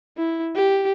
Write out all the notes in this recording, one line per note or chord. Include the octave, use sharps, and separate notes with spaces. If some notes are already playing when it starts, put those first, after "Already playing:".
E4
G4